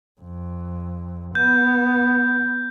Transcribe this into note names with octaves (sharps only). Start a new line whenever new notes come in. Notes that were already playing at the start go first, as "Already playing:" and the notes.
F2
B3 G6